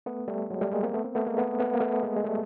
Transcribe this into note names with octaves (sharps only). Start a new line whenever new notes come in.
A3 B3
G3 A3
F#3 G#3
G3 A3
G#3 A#3
A#3 C4
A3 B3
A#3 C4
A3 B3
G#3 A#3
A3 B3
A3 B3
A#3
A3 B3
G#3 A#3
G#3
G3 A3